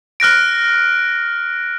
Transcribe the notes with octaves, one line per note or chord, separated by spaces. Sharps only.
F6 F#6 A#6 D7